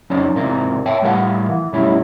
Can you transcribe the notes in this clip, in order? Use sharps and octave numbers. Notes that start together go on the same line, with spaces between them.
F2 F#3 C#4 D#4 C#5 D5
E2 G#2 C3 A#4 D5
C#5 E5 G5 A5
A2 G3 A#4 B4 F5 F#5
E3
F#2 B2 G3 A3 C#4 E4